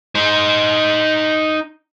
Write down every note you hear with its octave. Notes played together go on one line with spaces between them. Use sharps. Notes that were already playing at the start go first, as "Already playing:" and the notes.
D#4 C5